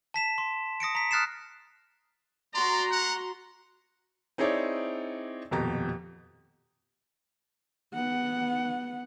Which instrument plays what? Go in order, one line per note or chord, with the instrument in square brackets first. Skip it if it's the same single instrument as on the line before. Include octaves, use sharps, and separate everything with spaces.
[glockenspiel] A5 B6 E7
C6
D#6 A#6 C#7 D7
A#5 B6
D#6 F6 F#6 A6 C7 E7
[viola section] F#4 A#5 C6 [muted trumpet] D5
[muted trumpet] F#5
[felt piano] C4 D#4 E4 G#4 C#5 D5
D#1 F2 B2 G4 A#5
[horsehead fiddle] B3 F#5